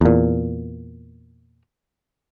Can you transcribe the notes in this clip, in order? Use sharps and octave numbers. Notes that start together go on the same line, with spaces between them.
E2 A#2